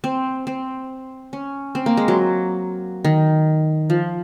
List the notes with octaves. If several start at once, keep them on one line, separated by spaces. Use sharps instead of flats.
C4
C4
C#4
C4
A#3
G#3
F#3
D#3
F3